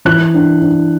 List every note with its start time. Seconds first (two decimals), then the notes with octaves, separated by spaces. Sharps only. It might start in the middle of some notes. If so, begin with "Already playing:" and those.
0.05 E3 F#6
0.34 D4
0.62 D4